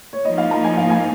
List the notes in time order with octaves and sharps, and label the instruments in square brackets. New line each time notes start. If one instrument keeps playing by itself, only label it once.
[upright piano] C#5
[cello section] F3 A#3 D#4 [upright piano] D#5
[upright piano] F5
A#5
G#5
F5
G#5